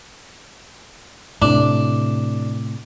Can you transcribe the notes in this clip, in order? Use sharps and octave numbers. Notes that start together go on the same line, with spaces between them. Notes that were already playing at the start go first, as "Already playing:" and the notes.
A2 C3 D4